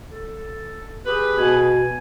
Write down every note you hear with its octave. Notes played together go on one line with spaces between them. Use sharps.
A4
G4 G#4 B4
B2 G#5